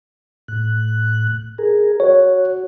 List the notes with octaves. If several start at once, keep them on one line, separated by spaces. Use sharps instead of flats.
A2 F#6
G#4 A#4
F#4 C#5